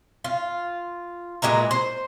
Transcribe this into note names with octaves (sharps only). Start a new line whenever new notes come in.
F4
A#2 G#3 B4 A#5
C5